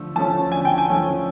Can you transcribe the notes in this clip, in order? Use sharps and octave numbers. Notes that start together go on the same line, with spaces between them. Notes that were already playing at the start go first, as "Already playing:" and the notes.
Already playing: D3 F3 A3
F3 A3 C#4 A5
D3 G#5
G5
G#5
F3 A3 C#4